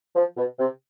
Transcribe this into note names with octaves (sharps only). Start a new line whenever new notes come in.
F3
B2
C3